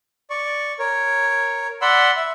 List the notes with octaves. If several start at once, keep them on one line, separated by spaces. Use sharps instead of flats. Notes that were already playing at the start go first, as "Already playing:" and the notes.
D5 C#6
A#4 C#5
D5 F#5 B5 C6 E6
E5